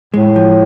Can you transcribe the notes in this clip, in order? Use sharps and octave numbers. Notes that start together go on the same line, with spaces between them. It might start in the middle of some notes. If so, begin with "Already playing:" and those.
A2 G#3
F3